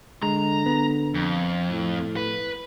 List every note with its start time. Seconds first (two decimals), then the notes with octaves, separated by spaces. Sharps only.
0.23 D3 G#3 A#5
0.66 B3
1.15 F2
1.70 A2
2.17 B4